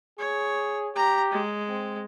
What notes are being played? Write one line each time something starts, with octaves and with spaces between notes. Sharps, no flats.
G#4 C#5
G4 A#5
G#3
C4